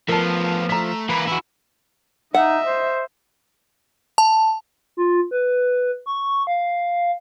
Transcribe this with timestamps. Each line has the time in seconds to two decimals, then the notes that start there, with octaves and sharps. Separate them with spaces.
0.09 F3 A3 B3 A#4 A5
0.69 A3 A#5 B6
1.09 E3 A#3 B4
1.27 E4 F#4
2.34 D#4 D#5 E5 F#5
2.65 C5
4.18 A5
4.97 F4
5.31 B4
6.06 C#6
6.47 F5